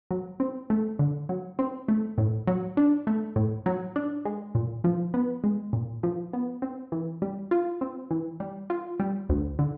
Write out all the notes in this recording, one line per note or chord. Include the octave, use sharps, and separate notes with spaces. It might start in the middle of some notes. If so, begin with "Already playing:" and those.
F#3
C4
A3
D3
F#3
C4
A3
A2
F#3
D4
A3
A2
F#3
D4
G#3
A#2
F3
B3
G#3
A#2
F3
B3
C4
E3
G3
F4
C4
E3
G3
F4
G3
D2
D3